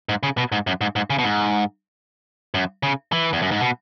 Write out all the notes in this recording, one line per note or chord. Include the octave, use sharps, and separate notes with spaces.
G#2
C#3
B2
G#2
F#2
G#2
G#2
C#3
B2
G#2
F#2
C#3
E3
E2
F#2
G#2
B2